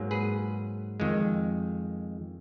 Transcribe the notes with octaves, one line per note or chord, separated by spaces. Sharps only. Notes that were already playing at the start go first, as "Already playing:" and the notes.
Already playing: G#2 F#3 A#3
G#4 B4
F2 D#3 G#3